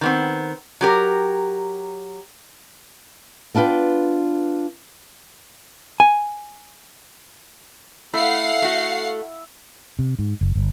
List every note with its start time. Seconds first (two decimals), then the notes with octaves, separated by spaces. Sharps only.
0.01 D#3 B3 C4
0.81 F#3 G4 A#4
3.55 B3 D4 F4 B4 G5
6.00 G#5
8.13 A3 E4 F5 F#5 C7
8.62 A3 F#4
9.99 C3
10.19 G#2
10.41 F#1
10.55 G1